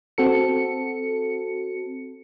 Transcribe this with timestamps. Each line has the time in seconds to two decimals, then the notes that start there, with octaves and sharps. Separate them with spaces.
0.18 C4 F#4 A4 C#7